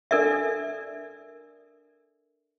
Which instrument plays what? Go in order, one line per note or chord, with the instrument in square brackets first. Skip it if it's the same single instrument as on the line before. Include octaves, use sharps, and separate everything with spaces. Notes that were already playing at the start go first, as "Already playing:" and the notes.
[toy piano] D4 A4 A#4 D5 E5